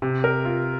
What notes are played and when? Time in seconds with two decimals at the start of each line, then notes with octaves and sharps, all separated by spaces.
0.02 C3
0.24 A#4
0.45 F4